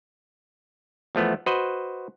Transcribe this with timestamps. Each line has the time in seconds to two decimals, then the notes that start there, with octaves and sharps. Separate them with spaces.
1.15 E2 F3 A3 B3
1.46 F#4 B4 C5 D#5